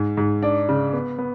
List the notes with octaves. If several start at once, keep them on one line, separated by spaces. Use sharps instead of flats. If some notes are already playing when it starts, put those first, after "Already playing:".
Already playing: G#2
G#2
D4
C#3
B3
B3